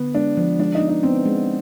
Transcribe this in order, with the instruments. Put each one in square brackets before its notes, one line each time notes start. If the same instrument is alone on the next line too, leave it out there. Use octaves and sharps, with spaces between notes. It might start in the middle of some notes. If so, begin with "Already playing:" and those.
Already playing: [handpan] D3 [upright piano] B3
[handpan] G#3 [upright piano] D4
[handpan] F3
[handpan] G#3 [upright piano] D4
[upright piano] D#4
[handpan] B3
[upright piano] D#4
[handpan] B3 [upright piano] C4
[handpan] G#3